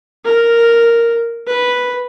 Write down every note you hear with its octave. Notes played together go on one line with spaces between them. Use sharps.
A#4
B4